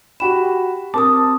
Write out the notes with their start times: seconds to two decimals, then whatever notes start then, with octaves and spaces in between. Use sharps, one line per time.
0.20 F#4 G4 G5 B5 E7
0.94 C4 A#4 A5 D6 D#6